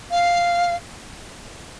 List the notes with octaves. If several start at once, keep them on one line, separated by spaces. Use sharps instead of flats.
F5